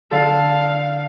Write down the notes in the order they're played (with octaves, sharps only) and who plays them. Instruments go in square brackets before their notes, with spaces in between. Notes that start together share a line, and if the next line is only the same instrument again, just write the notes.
[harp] D3 A4 [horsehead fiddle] F5